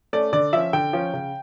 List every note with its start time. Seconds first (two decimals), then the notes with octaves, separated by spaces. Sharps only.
0.13 A3 C#4 D5
0.33 D3 D5
0.53 F3 C#4 E5
0.73 D3 G5
0.93 F3 C#4
1.13 C#3